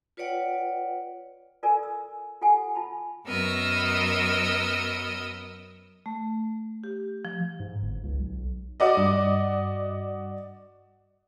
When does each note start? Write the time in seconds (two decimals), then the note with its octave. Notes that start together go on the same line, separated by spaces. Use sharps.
0.17 F4 B4 C#5 D5 F#5 G5
1.63 F4 A4 A#4 D5 G#5
1.83 E6
2.41 F4 G4 A4 F#5 G#5
2.75 F4 A5 B5
3.25 F#2 B3 A#4 D#5 E6
6.06 A3
6.84 G4
7.25 F3
7.60 G#2
7.82 G1
8.03 C#2
8.18 B1
8.80 F#4 D5 D#5
8.97 G2